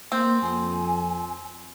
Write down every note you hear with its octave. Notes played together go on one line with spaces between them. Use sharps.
A#3 C4
F2 G#5